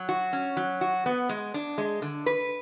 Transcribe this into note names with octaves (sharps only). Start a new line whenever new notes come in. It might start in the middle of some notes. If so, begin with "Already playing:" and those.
Already playing: F#3
F#4
C#4
F#3
F#4
B3
G#3
D4
G#3
D3
B4